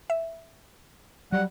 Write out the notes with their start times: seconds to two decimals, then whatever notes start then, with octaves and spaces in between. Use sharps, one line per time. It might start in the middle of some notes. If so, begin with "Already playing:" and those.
0.10 E5
1.32 F#3 G3 F#5